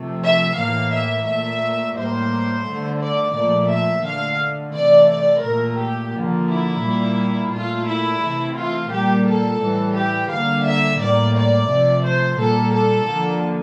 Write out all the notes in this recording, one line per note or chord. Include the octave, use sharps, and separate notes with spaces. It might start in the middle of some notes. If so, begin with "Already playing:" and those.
Already playing: C3 F3 A3
E5
A2 E3 A#3 F5
E5
A#2 A3 E5
A2 G3 A#3 C5
D3 A3
D5
A#2 F3 A3 D5
E5
D3 A3 F5
C3 E3 A3 D5
D5
A#2 A3 A#4
G4
D3 F3 A#3
E4
A#2 G3 A#3
A#2 A3 F4
E4
C3 E3 A3
F4
A#2 G3 A#3 G4
A4
A2 E3 G3
G4
D3 G3 A#3 F5
E5
A2 G3 A#3 D5
D5
C3 F3 A3
C5
A#2 G3 A#3 A4
A4
D3 F3 A#3